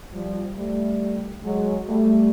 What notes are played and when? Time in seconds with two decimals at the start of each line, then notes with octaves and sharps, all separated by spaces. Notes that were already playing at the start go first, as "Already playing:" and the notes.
0.13 F3 G3
0.56 G3 A3
1.43 F#3 G#3
1.87 G3 A3